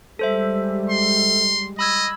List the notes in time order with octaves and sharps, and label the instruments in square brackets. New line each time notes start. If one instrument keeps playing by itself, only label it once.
[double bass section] G3 G#3 [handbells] A4 C5 E5
[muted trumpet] C6
[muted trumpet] D#5 [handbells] B5 E6 G#6